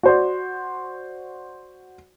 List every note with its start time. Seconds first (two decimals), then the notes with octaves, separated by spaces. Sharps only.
0.03 F#4 C5 D5